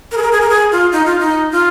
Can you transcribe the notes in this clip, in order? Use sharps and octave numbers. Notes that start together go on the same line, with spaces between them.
A#4
G#4
A#4
G#4
A#4
G#4
F4
D#4
F4
D#4
F4